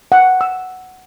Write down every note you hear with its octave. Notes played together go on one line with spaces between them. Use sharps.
F#5
E6